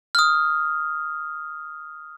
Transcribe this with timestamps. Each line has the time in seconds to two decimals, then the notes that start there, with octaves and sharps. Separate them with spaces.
0.15 D#6 F6